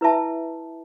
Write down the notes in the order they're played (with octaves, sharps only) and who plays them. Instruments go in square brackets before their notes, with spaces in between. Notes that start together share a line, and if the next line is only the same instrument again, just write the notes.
[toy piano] E4 B4 E5 A5